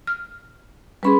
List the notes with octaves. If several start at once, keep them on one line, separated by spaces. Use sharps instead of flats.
F6
G3 C#4 G#4 B4 B5 C6